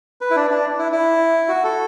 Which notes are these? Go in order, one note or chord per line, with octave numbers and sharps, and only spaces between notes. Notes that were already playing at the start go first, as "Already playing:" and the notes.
B4
E4
D4
D4
E4
E4
F#4
A4